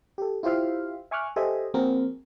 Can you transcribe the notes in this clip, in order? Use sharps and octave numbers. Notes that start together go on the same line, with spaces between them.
G4 A4
E4 F4 G4 C5 E5 F5
E5 G#5 C#6 D6 F6 F#6
G4 A4 C5 D#5 E5 G#5
F3 A#3 C4 F#4 G#4 A#4